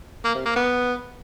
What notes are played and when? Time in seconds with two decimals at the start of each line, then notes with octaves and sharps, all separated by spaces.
0.24 A#3
0.35 C3
0.46 A#3
0.56 B3